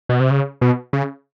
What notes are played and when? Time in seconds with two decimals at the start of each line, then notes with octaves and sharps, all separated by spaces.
0.09 B2
0.20 C3
0.31 C#3
0.61 B2
0.93 C#3